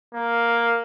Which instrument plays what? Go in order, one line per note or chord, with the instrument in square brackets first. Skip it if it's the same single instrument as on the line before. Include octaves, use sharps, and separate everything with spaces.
[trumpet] A#3